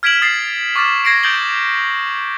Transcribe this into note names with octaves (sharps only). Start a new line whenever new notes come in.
F6 G#6 B6 D7 E7 F#7
D#6 A6 C7
C#6 D6 F6 A6 E7
G#6 A#6 C7 D7 F#7
D#6 G6 A6 D7 F#7 G7